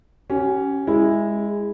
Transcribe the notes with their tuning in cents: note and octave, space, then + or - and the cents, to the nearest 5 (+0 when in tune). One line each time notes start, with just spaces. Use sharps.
C#4 +0 G4 -45
G#3 -15 E4 +0